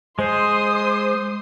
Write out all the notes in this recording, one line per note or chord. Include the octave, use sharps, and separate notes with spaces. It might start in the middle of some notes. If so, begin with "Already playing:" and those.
G#3 C5 C6 D#6